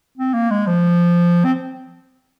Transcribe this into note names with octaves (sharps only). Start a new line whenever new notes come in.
C4
A#3
G#3
F3
C4